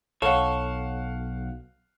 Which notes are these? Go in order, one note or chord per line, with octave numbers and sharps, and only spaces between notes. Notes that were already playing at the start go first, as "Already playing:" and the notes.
B1 A4 C#5 F5 F#5